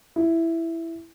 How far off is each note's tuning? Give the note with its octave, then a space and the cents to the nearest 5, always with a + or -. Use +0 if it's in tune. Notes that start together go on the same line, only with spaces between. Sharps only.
E4 +5